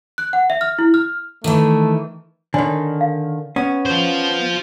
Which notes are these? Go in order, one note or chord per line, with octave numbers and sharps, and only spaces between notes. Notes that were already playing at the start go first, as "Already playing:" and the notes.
F#6
F#5
E5
F6
E4
F6
D#3 E3 A3
D3 D#3 C#5 D5 G#5
F5
B3 C#4
F4 C5